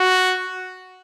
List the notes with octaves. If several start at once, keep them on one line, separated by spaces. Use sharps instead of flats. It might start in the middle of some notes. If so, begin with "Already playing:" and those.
Already playing: F#4